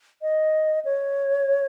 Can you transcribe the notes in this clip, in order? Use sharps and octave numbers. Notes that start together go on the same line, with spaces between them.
D#5
C#5